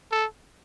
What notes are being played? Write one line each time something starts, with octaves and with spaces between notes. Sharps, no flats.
A4